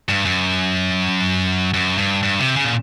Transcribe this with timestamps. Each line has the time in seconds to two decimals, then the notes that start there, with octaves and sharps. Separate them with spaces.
0.09 G2
0.25 F#2
1.74 F#2
1.98 G2
2.23 G2
2.40 C3
2.56 C#3
2.65 A#2